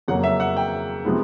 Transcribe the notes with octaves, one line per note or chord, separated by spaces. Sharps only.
F2 C#3 F#3 A#3 F#5
E5
F#5
G5
C3 F3 G#3 B3 D#4